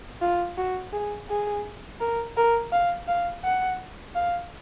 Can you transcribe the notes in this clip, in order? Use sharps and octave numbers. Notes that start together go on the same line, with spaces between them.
F4
F#4
G#4
G#4
A#4
A#4
F5
F5
F#5
F5